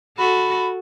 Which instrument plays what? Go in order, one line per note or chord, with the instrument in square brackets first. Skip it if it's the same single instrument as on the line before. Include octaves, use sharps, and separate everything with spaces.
[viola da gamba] F#4 A4 [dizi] B5